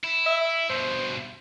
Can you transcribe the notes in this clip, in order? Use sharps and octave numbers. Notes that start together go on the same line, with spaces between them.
E4
E5
G2 B2 C5